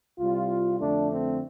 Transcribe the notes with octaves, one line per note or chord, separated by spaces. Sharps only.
C2 C3 G3 F4
F2 D3 A3 D4
C4